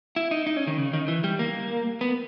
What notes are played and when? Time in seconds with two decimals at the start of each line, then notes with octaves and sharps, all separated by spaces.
0.16 E4
0.31 D#4
0.47 D#4
0.57 C#4
0.67 D#3
0.77 C#3
0.93 D#3
1.08 E3
1.24 G3
1.39 A#3
2.01 B3